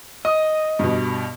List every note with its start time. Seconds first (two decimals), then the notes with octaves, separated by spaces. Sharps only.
0.25 D#5 D#6
0.79 G2 B2